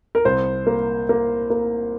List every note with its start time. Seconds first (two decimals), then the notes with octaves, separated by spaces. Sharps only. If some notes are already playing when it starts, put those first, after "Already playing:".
0.15 A#4
0.25 C2 C5
0.67 A#3
1.09 A#3
1.50 A#3